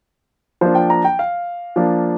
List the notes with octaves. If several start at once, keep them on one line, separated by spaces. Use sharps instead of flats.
F3 A#3 D4 C5
G5
A#5
G5
F5
F3 A#3 D4